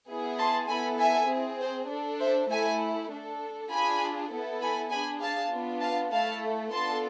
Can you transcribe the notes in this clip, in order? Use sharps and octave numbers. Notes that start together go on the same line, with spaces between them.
B3 E4 G#4
A5 C6
B3 E4 A4 G#5 B5
E5 G#5
C4 G#4
C5
D4 A4
C5 E5
A3 E4 A4 E5 G#5
D4 A4
D4 F4 G#4 G#5 B5
B3 E4 A4
G#5 B5
D4 G#4 G#5 B5
F5 A5
B3 D4 F4
F5 A5
A3 E4 A4 F5 A5
B3 D4 F4 A4 A5 C6